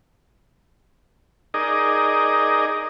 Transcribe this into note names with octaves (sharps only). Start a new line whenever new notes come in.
D#4 G#4 A#4 D5 D#5